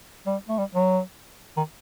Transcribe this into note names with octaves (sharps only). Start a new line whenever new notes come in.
G3
A3
G3
F#3
D#3